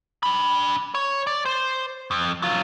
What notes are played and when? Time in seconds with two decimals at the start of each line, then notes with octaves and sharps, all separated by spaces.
0.23 D4 B5
0.95 C#5
1.27 D5
1.45 C5
2.11 F2
2.42 F#3 F4